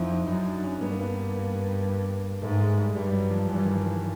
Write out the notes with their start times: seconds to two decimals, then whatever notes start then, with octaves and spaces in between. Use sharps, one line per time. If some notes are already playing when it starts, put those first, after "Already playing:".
Already playing: F2 D#4 E4
0.10 D#4
0.28 F#2 D#4
0.46 D4
0.64 C#4
0.81 G2 B3
0.91 A#3
1.01 B3
1.35 A#3
2.42 G#2 A3
2.59 G#3
2.77 G3
2.95 G2 G3
3.06 G3
3.13 F#3
3.31 F3
3.48 G2 E3
3.66 D#3
3.84 E3